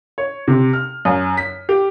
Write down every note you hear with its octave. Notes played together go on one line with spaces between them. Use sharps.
C#5
C3
F6
F#2
B6
G4